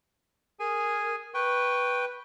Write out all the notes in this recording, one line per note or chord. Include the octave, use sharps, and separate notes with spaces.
G#4 A#4 G#5
B4 G5 C#6